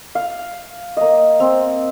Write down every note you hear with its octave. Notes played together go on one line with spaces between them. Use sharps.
F5
A#3 D#5
C4